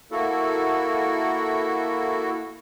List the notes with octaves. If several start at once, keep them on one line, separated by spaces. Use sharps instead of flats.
A#3 E4 F#4 A4